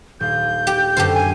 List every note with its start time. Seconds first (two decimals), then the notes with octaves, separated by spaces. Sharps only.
0.20 D#1 F5 G6
0.67 G4
0.97 F#2 D3 G4 A4 C5
1.14 G#5